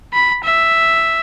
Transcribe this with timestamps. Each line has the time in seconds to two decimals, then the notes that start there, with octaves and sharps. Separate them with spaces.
0.13 B5
0.44 E5